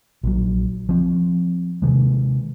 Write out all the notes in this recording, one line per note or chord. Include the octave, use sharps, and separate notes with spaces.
A#1 F#3
F3 C4
C3 D#3 G#3